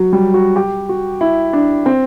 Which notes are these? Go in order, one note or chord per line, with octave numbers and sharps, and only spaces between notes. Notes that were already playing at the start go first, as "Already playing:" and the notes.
Already playing: F#3 F#4
G3
F#4
G4
F#4
E4
D4
C4